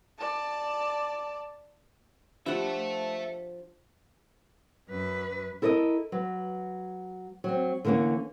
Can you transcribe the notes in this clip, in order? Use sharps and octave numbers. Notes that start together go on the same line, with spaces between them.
D5 A5
F3 D4 G4 A4 D5 E5 F#5
F#2 B4
E4 A4 A#4 D5 D#5
F#3 B4
F#3 C4
D3 E3 A#3 C4 C#4